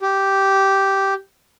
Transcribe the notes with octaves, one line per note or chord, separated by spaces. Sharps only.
G4